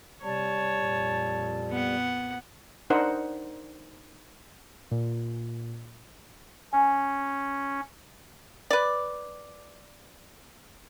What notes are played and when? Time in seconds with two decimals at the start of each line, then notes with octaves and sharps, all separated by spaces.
0.23 C3 G3 C#5 A5
0.79 F2 A#2
1.70 B3 F#5
2.90 D4 D#4 A#4 C5 D#5 F#5
4.91 A#2
6.73 C#4 G#5
8.70 B4 D5